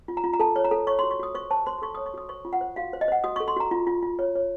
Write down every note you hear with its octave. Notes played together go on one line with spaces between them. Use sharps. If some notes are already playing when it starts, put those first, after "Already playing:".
F4
A#5
F4
A#5
A4 A5
C#5
A#5
A4
C#5 C#6
C6
F#4
C#6
F#4 D#6
C5 C#6
C5 A5
C5 C6
C6
A4 C#6
C#5 D#6
C#6
F#4 D#6
C5 C#6
F4
F#5
C5
F#4 F5
C5
D#5
C5 F#5
F#4 D#6
C#6
A4
C6
F#4 A#5
F4
F4
F4
C#5
C#5